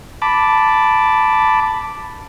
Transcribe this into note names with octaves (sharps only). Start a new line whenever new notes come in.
A5 B5 D6